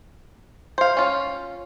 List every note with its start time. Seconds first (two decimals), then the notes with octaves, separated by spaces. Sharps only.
0.78 C5 F5
0.97 C#4 F4